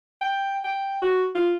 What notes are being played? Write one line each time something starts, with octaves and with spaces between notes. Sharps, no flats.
G5
G5
F#4
F4